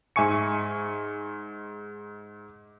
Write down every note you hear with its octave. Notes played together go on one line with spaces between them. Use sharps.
G#2 E5 G#5 C#6 C#7